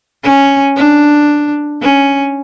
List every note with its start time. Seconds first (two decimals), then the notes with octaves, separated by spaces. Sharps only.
0.23 C#4
0.76 D4
1.82 C#4